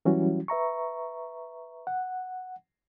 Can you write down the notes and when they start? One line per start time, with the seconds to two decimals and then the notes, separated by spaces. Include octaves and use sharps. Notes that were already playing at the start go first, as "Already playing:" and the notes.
0.05 E3 F#3 G3 C#4 E4 F#4
0.48 B4 E5 A#5 C#6
1.87 F#5